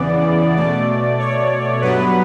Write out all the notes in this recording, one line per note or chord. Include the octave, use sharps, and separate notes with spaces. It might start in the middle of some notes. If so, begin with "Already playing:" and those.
Already playing: E2 C#3 E3 B3 D5
B2 A3 D5
C#5
G2 F#3 B3 B4